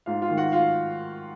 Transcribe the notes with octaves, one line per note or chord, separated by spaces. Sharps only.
G#2 F4 F5
F4 F5
D#3
F#4 F#5
F4 F5